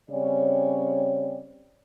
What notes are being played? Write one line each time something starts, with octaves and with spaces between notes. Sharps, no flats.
C#3 G3 C4 C#4 C#5 D5